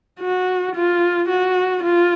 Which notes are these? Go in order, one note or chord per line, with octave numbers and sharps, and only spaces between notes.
F#4
F4
F#4
F4